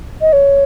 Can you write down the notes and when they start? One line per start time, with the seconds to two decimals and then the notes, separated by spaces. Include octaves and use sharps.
0.21 D#5
0.33 C#5